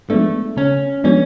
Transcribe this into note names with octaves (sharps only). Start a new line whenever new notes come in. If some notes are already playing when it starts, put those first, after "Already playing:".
F3 G#3 A3 B3 D4
C#3 C#4
F3 G#3 B3 C#4 D4